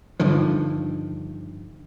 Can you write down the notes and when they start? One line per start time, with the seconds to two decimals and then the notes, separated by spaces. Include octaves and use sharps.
0.20 G2 D3 D#3 F3